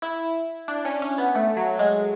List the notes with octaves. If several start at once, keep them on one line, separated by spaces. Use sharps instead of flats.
E4
D4
C#4
C#4
B3
A3
F#3
G#3